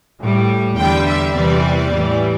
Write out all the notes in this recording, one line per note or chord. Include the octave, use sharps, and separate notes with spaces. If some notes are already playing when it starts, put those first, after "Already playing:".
A2 G3
E2 D3 G3 G5
E5
E2 C3 E3 G3 D5
A2 E3 G3